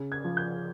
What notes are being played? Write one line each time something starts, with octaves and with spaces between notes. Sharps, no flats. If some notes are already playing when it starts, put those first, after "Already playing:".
Already playing: C#3
G#6
F3
G6